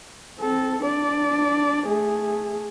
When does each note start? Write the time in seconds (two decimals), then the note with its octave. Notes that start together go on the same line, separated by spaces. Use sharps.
0.40 C4 A4
0.82 D4 D5
1.88 A3 G#4